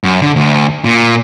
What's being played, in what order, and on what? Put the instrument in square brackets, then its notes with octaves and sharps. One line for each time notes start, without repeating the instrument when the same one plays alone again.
[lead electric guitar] F#2
D3
D2
A#2